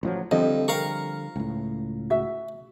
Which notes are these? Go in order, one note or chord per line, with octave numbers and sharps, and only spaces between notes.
A1 F3 F#3
F2 D3 F3 G3 D#5
A#4 F5 G5 A#5 C#6
C#2 A2
F#4 E5